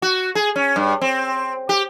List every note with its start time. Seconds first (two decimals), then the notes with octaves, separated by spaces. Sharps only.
0.02 F#4
0.35 G#4
0.56 C#4
0.76 G2
1.01 C4
1.69 G4